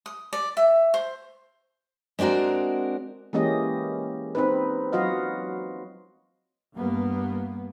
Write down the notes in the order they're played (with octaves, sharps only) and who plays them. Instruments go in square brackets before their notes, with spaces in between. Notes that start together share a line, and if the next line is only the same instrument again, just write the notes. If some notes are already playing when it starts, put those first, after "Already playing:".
[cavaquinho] D#6
D5
E5
C5
[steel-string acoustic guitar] G#3 C4 D4 F#4 A#4
[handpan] E3 G#3 A#3 C#4 G4 D#5
C4 D#4 B4
F#3 F4 F#4 D#5 F5
[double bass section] G2 A#3 B3